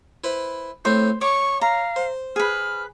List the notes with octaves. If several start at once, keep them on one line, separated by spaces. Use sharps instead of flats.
E4 B4 C5
A2 A3 C4 C5 G6
C#5 C#6 D6
F5 A#5
C5
G#4 B4 F6